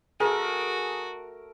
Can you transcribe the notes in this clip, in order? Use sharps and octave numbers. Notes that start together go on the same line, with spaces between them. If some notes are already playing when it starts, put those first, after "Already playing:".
A3 F#4 G#4 A#4